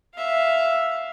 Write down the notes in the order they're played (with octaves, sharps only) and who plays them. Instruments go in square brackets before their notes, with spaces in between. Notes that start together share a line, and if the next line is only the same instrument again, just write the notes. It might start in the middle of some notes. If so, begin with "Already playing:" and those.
[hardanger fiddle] E5 F5